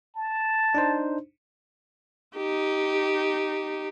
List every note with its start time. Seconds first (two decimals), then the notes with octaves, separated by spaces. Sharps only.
0.16 A5
0.75 D4 D#4 C5
2.36 D#4 G4